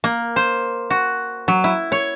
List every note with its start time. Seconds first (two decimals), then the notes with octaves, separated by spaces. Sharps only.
0.04 A#3
0.36 C5
0.90 F#4
1.48 F#3
1.64 E4
1.92 C#5